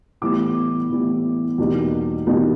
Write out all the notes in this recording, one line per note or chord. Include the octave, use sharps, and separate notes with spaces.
A2 E3 G3 B3 E4 D6
A2 E3 G3 B3 E4
E2 B2 G3 A#3 D#4
E2 B2 G3 A#3 D#4